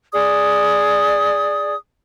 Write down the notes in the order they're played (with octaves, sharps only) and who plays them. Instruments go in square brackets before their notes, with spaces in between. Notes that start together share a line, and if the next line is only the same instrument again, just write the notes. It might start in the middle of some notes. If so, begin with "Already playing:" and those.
[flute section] G#4 D5 D#6